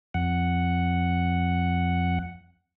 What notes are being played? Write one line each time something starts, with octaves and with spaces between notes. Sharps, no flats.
F2 F#5